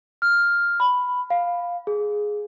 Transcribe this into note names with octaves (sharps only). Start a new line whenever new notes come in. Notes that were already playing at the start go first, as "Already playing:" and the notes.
F6
B5
F5
G#4